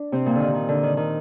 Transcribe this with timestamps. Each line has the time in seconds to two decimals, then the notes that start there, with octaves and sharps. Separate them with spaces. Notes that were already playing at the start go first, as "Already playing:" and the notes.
Already playing: D4
0.12 C3 C4
0.26 A#2 A#3
0.35 D3 D#3
0.54 D#3
0.69 D3
0.83 D#3
0.97 D#3